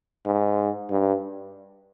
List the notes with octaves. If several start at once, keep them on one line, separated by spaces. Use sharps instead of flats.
G#2
G2